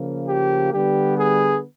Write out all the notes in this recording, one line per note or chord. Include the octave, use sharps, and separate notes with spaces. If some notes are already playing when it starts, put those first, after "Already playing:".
Already playing: C#3 F3 A#3
G4
D3 G3 B3 G4
G#4